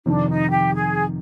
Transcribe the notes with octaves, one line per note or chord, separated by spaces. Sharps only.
F2 C3 D#3 D4
D#4
G4
G#4